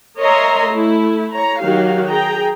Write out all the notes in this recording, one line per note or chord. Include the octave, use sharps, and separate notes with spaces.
A#4 C#5 D#5 E5 A#5 C6
A3 E4
C#5 A#5
D#3 F#3 F#4 G4 F5
G#4 G5 A#5